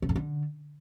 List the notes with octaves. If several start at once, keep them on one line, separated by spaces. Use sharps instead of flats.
D3
G2
D3